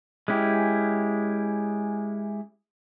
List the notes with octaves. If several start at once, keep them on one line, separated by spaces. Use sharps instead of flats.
G#3 C#4 E4 G4